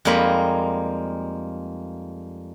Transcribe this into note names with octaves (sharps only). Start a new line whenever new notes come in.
F2 G3 G#3 A#3 D#4 B5